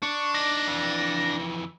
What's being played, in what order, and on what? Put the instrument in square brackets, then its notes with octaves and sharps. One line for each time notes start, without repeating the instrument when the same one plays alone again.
[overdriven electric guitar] D4 [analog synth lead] C#6
[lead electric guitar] D#4 D5 [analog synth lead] A#6
[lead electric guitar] F2 E3